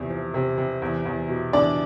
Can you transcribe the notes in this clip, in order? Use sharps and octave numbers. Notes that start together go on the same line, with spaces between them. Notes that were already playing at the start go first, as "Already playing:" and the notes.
Already playing: E2 C3 F3
F3
C3
C3
E2
E2
B2
E2 D4 D5